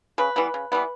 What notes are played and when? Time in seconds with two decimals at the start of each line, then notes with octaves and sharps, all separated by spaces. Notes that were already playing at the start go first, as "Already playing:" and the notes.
0.18 C#3 B4
0.36 E3 G3 B3
0.54 C#3
0.72 E3 G3 B3